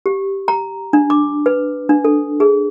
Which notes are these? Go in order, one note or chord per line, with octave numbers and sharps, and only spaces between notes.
G4
A#5
D4
D6
B4
D4
A4
G#4